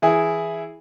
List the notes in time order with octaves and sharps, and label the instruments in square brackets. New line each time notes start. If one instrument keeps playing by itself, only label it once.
[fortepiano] E3 E4 G#4